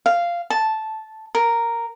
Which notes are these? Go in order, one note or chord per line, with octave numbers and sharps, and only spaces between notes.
F5
A5
A#4